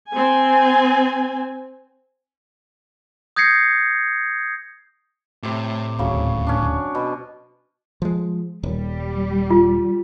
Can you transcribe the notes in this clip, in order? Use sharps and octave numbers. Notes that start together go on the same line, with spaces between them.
C4 G#5
D#6 G6 G#6 A#6 C7 C#7
A2 C3 D5
D1 D#2 C#3 F#3
C#4 D4
B2
F3 G#3
D#1 G3
F4